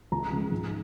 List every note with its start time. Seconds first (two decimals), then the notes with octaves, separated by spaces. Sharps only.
0.12 C#2 A#5
0.32 C#3 F3 G#3
0.52 G#2